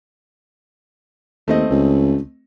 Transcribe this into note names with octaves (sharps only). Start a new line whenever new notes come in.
D#2 A3 C4 D#5
C#2